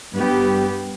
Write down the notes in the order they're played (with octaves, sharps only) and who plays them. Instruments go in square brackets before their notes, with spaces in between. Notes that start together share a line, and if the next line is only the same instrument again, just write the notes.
[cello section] G2 B3 G4